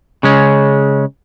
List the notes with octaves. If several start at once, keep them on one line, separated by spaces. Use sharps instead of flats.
C#3 G#3 C#4